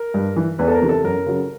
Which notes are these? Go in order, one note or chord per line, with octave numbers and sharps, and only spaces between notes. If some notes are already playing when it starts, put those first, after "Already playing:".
Already playing: A#4
G2
E3
E2 B4
A4
A#4
C3 E3
A4
F#2 A#4
C#3 F#3